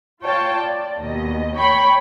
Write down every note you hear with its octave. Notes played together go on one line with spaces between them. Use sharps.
F4 C#5 G5 A5
D5
D#2 B2 D#5
C#5 G5 B5 C#6